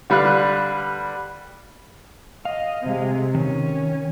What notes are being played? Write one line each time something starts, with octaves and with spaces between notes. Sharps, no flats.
D3 G3 B4 F5 F#6
D#5 F5
C3 G#3
D#3 C#4